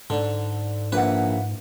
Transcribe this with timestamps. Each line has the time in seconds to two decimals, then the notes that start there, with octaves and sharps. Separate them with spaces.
0.10 G#2 D3
0.92 A#1 A#3 B4 E5 F#5